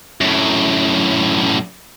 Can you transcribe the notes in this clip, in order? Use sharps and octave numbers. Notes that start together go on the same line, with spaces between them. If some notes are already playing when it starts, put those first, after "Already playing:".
F#2 A2